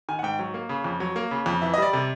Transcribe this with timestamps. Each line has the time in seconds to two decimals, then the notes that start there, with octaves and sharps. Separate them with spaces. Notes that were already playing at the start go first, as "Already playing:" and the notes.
0.09 D#3 G#5
0.19 F#5
0.23 G#2 G5
0.39 F#3
0.54 A#3
0.69 C#3
0.84 F2
1.00 F#3
1.16 A#3
1.31 C#3
1.46 F2
1.62 E3 E5
1.74 D#5
1.77 G3 D5
1.93 C3